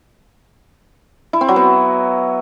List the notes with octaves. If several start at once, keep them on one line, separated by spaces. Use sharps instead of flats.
E4
C4
F#3
B3